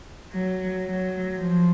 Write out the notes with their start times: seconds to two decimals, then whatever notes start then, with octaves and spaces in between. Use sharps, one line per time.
0.32 F#3
0.86 F#3
1.38 F3